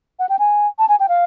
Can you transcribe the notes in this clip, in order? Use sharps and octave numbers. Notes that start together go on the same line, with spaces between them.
F#5
G5
G#5
A5
G#5
G5
F5